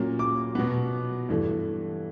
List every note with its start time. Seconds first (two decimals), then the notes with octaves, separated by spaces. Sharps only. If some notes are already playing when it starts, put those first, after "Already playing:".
Already playing: A#2 F#3 A#3 C#4
0.19 D6
0.55 B2 F#3 B3
1.29 G2 E3 A3